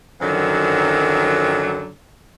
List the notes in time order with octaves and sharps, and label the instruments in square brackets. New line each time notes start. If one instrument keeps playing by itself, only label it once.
[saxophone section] F#2 D3 D#3 F3 F#3